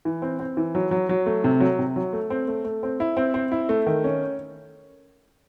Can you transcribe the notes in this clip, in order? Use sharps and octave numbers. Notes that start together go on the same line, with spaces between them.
E3
C4
C4
E3
F#3
F#3
F#3
A3
C3
F#3
C3
F#3
A3
C4
A3
A3
C4
E4
C4
C4
E4
A3
D#3
C#4